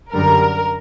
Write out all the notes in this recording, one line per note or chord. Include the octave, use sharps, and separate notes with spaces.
F#2 D3 G3 A#4